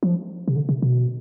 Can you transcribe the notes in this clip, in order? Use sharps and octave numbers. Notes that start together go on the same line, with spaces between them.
F3
C3
D3
C3
B2